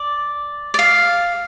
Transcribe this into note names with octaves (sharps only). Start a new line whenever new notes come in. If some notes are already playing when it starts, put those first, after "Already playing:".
Already playing: D5
D5
F5